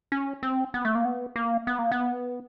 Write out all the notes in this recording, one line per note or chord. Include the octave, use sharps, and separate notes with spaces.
C#4
C4
B3
A3
A#3
B3
A#3
B3
A#3
B3